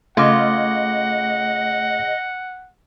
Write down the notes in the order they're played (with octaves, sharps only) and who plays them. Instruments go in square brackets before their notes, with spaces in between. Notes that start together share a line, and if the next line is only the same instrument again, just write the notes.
[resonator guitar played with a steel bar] C#3 F4 [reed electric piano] A3 D6 [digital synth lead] D#5 [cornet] F#5